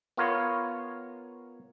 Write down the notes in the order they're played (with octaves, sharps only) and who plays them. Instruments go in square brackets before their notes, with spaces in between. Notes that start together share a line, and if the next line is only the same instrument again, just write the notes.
[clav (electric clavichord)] B3 F4 A#4 C#5 F5